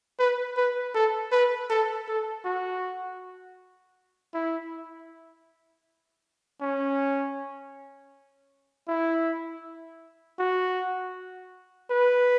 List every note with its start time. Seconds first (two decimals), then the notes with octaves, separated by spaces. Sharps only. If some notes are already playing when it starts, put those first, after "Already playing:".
0.19 B4
0.57 B4
0.94 A4
1.32 B4
1.70 A4
2.08 A4
2.45 F#4
4.34 E4
6.61 C#4
8.88 E4
10.39 F#4
11.90 B4